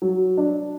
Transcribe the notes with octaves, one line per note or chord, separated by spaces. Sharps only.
F#3
D4